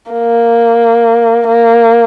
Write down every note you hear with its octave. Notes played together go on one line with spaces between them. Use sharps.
A#3
A#3